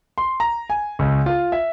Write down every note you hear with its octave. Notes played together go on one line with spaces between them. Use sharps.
C6
A#5
G#5
C#2
F4
E5